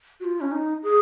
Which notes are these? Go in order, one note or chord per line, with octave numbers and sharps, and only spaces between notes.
F#4
F4
C#4
D#4
G#4